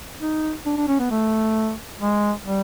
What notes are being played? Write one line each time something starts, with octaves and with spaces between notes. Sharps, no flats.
D#4
D4
D4
C#4
B3
A3
G#3
G3